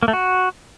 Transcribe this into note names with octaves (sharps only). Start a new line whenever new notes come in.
A#3
A3
F#4